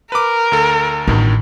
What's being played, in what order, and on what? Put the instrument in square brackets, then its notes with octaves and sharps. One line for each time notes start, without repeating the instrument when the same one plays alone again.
[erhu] A#4 [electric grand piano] B4 D6
[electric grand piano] D2 A4
[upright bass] A1 [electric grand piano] G2 B2 D#3